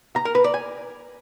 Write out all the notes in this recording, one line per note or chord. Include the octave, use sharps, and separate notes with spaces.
A#5
A#4
B4
D5
G#5